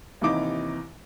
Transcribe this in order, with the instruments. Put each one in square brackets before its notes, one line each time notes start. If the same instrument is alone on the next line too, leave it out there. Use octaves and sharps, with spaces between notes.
[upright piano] D#2 C3 E3 D#4 D6